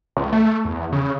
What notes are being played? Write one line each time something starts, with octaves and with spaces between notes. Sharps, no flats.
C#2
A3
E2
C#3